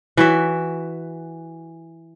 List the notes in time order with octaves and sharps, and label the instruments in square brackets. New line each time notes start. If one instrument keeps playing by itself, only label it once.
[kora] E3 F#4 E5